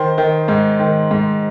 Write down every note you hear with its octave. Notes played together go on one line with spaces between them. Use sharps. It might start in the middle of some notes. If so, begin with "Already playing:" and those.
Already playing: D#3 C5
D#3
G#2
D#3
G#2